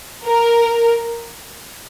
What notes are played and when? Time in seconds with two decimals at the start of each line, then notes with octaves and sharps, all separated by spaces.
0.25 A#4